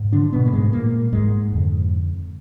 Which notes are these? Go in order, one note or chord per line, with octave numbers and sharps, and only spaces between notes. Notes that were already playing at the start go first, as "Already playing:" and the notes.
Already playing: G#2
D3 D4
B2 B3
A#3
G#2 G#3
A#2 A#3
G#2 G#3
F2 D3